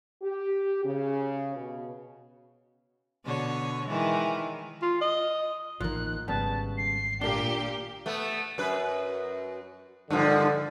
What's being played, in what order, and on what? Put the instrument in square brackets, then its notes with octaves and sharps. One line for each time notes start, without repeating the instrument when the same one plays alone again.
[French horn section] G4
C#3
B2
[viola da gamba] B2 D3 C#5
D#3 E3 G#3
[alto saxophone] F4
D#5
[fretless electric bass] A1 D#3 [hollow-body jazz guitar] F3 A#3 [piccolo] F#6
[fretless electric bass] G#1 [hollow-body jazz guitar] C#3 G3 B3 [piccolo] A5
[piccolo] C7
[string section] A#2 G4 [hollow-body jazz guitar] D4 A#4 [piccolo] G7
[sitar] A3 B3
F#2 B4
[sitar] G2 D#3 F3 [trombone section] D3